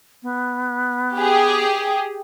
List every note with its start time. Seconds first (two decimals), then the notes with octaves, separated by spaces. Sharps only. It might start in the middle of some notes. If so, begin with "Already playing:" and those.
0.23 B3
1.14 G4 G#4